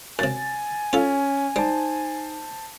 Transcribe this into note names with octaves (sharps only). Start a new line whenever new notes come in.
F#2 C3 G#5 A6
C#4 F4 A4
G3 D#4 C5 A5